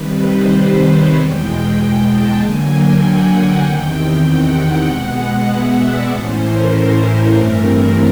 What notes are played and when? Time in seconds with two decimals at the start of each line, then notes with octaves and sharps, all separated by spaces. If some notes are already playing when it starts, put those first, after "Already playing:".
Already playing: C3 D#3 G3 B4
0.21 C5
0.83 C#5
1.13 E2 B2 G#3 G5
1.76 G5
2.06 A5
2.37 D3 F#3 A#3 G#5
2.69 G5
3.00 F#5
3.62 E2 C3 D#3 G5
4.24 F#5
4.86 B2 G#3 B3
5.48 E5
5.78 D5
6.10 A2 E3 A3 C#4 C5
6.41 A#4
7.34 G2 E3 A3 C4